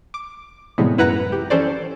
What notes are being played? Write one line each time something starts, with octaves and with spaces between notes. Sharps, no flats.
D6
A2 C3 E3 G3 G#3 B3
F#2 E4 B4 F#5 A#5 F#6
G4
E3 C#4 A4 C5 D5